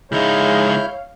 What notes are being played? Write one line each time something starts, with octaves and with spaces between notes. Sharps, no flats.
C#2 G#3 D#4 E4 C#5 F5 F6 G6